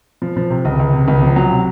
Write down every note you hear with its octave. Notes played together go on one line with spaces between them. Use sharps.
F3
F3
C3
C#2
C#2
C3
C#2
F3
F#3
C3